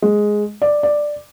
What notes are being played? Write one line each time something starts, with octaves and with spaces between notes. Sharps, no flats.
G#3
D5
D5